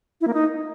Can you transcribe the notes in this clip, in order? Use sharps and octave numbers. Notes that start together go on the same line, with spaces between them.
E4
A#3
D#4